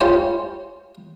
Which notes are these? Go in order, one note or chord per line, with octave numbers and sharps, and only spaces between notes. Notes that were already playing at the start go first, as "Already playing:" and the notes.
G3 C#4 F4 C5 C#5